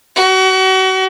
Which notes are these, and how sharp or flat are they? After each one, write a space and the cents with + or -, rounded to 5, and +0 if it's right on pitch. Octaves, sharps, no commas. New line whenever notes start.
F#4 +35